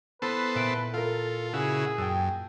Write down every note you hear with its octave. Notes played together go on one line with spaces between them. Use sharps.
B3 E4 A4 B4 C5
A#2 E5 D7
F4 A4 A#4 F5
C#3 E4 F#4 G#4
F#2 G5 A5 E6